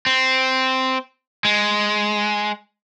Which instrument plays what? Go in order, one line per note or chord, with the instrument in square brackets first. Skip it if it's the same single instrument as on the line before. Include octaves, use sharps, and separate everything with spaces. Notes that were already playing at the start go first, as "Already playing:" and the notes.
[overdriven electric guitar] C4
G#3